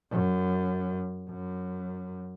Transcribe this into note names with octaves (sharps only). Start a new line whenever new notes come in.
F#2
F#2